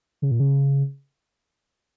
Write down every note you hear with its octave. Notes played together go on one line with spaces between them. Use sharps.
C#3
A#2
C#3